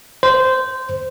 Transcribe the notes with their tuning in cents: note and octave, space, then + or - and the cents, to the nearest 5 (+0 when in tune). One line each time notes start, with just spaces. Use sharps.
C5 -15